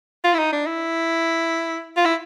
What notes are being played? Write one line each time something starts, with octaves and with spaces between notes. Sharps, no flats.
F4
E4
D#4
D4
E4
F4
E4